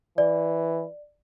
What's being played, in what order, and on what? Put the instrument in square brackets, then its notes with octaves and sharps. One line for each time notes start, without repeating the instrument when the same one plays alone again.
[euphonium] E3 [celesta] D5